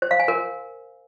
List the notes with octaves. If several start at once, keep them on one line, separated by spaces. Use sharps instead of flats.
C5
F5
G#5
A#4